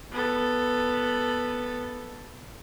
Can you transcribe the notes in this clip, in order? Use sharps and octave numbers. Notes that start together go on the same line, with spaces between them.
B3 A4